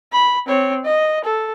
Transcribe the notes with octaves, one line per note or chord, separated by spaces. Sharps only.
B5
C4 C#5
D#5
A4